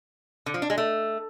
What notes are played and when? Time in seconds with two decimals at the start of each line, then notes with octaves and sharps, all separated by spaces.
0.46 D3
0.54 F3
0.62 D4
0.70 G#3
0.78 A3